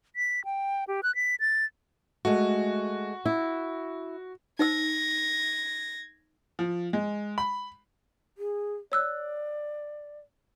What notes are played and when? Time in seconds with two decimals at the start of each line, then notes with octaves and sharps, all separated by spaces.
0.16 B6
0.45 G5
0.88 G4
1.03 F#6
1.15 B6
1.40 A6
2.25 G#3 A3 F#4
3.26 E4
4.59 D#4 C5 E6 G#6 A#6
6.59 F3
6.93 G#3
7.38 B5
8.38 G#4
8.92 C#5 D5 E6 F#6